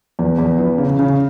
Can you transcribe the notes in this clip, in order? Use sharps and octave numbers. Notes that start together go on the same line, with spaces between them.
E2
E2
E3
C#3
C#3